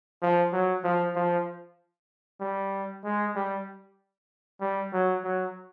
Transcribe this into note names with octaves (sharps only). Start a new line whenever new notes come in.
F3
F#3
F3
F3
G3
G#3
G3
G3
F#3
F#3